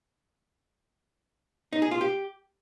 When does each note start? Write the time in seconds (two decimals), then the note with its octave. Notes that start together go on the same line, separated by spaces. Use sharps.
1.73 D#4
1.82 G#4
1.91 F4
2.01 G4